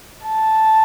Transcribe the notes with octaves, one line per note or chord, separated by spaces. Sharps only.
A5